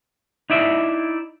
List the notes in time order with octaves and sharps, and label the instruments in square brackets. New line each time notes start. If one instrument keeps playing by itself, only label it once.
[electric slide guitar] D#4 E4 D5 E5